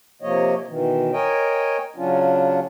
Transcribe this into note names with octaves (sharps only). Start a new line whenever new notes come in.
C3 F3 A#3 C#5 D#5
B2 D#3 E3
A#4 C#5 D#5 G5 G#5
C#3 F#3 C#4 D4 F4